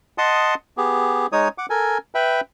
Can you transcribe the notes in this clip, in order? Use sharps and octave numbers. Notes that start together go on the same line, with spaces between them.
D#5 F#5 A5 C6 D#6
B3 G4 G#4
G#3 D#4 C#5 D#6
F#5 D6
A4 A#4 G#5
B4 E5 G5 B5